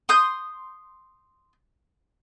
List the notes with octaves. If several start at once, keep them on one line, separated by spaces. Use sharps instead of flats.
C6 D#6 G6